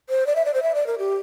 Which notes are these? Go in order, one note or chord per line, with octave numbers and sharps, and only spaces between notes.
C5
D5
E5
D5
C5
E5
D5
A#4
G4